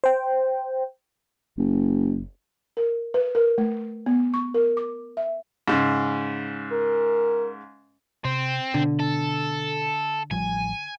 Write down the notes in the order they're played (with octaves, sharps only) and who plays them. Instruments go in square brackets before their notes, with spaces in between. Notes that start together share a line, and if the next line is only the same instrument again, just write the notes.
[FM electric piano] C5 G5
[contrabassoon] F#1
[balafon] A#4
B4
A#4
A3
B3
C#6
A#4
D6
E5
[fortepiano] G#2 C#3
[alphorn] A#4
[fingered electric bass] C3 [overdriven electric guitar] C4
[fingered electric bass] B2 [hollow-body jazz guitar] D3
[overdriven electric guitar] A4
[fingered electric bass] A1 F3 G3 [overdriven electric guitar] G#5